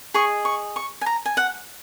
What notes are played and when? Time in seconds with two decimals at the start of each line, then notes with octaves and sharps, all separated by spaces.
0.14 G#4 D#5 C#6
0.45 C#6
0.76 C#6
1.01 G#5
1.06 A#5
1.25 G#5
1.37 F#5